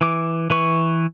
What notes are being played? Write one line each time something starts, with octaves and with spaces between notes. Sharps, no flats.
E3 D6
E3 B4 C#6